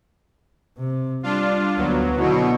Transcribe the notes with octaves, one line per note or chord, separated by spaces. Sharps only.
C3
G3 D4 F4
D2 F#3 B3
B2 D3 E4